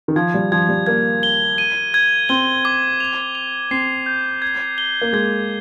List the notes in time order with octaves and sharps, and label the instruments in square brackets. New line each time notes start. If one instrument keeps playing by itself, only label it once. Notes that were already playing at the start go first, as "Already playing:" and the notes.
[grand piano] D#3
[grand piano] F3 [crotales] G#6
[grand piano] G3
[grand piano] F3 [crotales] G#6
[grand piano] G3
[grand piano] A#3 [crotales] G#6
[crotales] G7
D#7
G#6
[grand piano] C4 [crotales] G7
[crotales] D6
F7
F7
[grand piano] C4 [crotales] C7
[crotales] G6
G#6
G7
[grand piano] A#3
[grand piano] G#3 [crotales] G#6